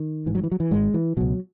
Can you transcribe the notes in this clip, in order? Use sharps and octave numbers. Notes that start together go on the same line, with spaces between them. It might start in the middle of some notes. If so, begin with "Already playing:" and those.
Already playing: D#3
A1 G#2 E3
F#3
E3
F#3
E3
G#1 G#2 G#3
E3
C#2 B2 F#3